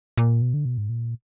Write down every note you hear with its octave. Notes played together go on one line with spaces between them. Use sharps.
A#2
B2
D3
B2
G#2
A#2